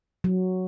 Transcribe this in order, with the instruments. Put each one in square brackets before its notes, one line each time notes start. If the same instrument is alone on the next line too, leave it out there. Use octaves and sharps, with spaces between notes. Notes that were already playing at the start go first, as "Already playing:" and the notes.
[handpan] F#3